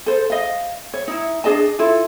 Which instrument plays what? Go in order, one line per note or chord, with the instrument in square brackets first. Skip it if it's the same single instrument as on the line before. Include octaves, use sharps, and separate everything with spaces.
[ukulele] A4 C5
D#5 F5
C#5
D#4 E4
D4 G#4 D#5 A5
E4 F4 A4